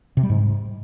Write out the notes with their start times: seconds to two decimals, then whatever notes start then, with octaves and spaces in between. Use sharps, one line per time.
0.17 C3
0.23 G3
0.30 G#2